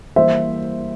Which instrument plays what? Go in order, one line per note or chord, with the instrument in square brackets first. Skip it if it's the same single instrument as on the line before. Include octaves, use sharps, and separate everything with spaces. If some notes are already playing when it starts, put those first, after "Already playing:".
[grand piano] E3 G3 A#3 [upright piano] C5 E5